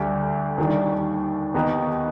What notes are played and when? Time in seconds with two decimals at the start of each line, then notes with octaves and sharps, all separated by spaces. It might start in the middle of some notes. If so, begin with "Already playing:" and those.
Already playing: D2 D3 G3 D4 G4
0.58 D#2 D#3 G3 D4
1.54 D#2 D#3 B3 D#4 G4